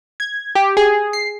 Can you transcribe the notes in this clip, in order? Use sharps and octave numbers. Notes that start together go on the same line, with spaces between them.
G#6
G4
G#4
C7